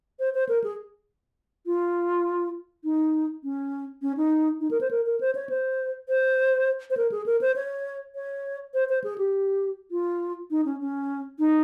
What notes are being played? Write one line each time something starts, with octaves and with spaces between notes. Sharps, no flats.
C5
C5
A#4
G#4
F4
D#4
C#4
C#4
D#4
D#4
A#4
C5
A#4
A#4
C5
C#5
C5
C5
C5
A#4
G#4
A#4
C5
C#5
C#5
C5
C5
G#4
G4
F4
D#4
C#4
C#4
D#4